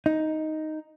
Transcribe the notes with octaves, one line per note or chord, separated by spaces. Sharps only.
D#4